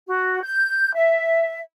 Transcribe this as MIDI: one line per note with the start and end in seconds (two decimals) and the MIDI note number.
0.07 0.41 66
0.43 0.94 91
0.95 1.60 76